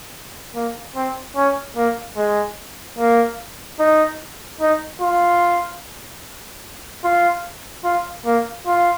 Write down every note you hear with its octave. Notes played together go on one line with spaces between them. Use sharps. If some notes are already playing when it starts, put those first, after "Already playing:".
A#3
C4
C#4
A#3
G#3
A#3
D#4
D#4
F4
F4
F4
A#3
F4